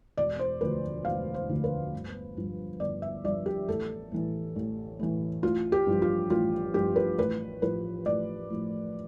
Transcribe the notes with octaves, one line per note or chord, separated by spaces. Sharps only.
E1 D5
C5
D2 D3 F3 B4
E1 F5
C5
D2 D3 F3
B4
G1
G2 F3
G1 D5
E5
G2 F3 D5
G4
A1 A4
A2 E3
A1
A2 E3
A1 F4
G4
G2 F3
F4
A1 F4
G2 F3 G4
B4
A1 B4
A2 F3 B4
A1 D5
A2 F3